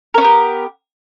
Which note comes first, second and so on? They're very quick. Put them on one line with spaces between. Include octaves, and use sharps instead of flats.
A#4 C#4 B3 G4